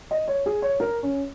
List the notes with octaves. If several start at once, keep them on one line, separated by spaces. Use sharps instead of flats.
D#5
C#5
G#4
C#5
A#4
C#4